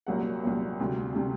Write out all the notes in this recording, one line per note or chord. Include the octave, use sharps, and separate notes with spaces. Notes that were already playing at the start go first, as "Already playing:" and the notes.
C2 A#2 F#3 A#3 F#5
C2 A#2 F#3 A#3
D2 C3 G3
C3 G3